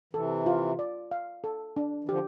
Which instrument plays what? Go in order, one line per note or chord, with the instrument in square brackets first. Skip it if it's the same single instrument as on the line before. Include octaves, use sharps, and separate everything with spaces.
[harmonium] C3 E3 [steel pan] A4
[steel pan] F4
D5
F5
A4
D4
[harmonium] E3
[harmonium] D3 F3 [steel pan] G4